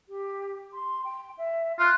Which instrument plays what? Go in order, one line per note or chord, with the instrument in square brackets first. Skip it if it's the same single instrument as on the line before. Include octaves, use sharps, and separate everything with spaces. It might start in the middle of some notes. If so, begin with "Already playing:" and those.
[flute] G4
C6
G5
E5
[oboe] F4 [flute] F#6